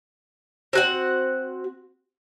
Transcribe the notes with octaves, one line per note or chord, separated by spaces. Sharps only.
C4 F#4 F#5